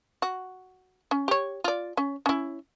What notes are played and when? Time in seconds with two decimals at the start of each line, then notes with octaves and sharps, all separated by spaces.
0.22 F#4
1.11 C#4
1.28 G4 C#5
1.64 F4 D5
1.97 C#4
2.26 C#4 E4